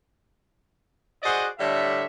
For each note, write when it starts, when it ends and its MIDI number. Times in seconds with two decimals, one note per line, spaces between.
1.23 1.47 66
1.23 1.47 68
1.23 1.47 72
1.23 1.47 74
1.23 1.47 75
1.23 1.47 78
1.59 2.04 45
1.59 2.04 50
1.59 2.04 55
1.59 2.04 73
1.59 2.04 76